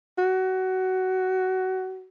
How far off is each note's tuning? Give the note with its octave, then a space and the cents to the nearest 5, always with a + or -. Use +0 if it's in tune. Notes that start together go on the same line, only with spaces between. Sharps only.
F#4 +20